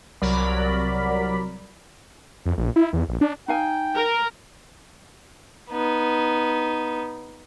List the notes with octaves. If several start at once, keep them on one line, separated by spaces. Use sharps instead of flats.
C2 F#3 A#4 D5 B5
F2
A#1
E4
E2
A#1
D4
D#4 F5 G5 G#5
A#4
B3 D#4